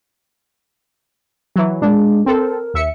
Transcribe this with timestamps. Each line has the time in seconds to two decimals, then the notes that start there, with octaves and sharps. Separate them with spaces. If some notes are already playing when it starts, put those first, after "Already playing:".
1.56 E3 F#3
1.81 A#2 G#3 D4
2.26 C4 A4 A#4
2.74 D#2 E5 C#7